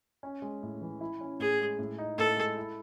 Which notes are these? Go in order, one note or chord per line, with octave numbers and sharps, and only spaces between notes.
C#4
G#3
A2
E3
E4
C#4
A2 G#4
G#3
A2
D#4
A2 A4
G#3
E4